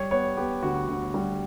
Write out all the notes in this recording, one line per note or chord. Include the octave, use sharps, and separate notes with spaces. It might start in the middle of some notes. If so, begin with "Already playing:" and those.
Already playing: G3 C#5
B3 C#5
B3 G4
D2 F#4
D2
G3